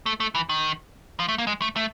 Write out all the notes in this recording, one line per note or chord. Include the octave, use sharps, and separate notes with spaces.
A3
A3
E3
D#3
F3
A3
A#3
G#3
A3
A3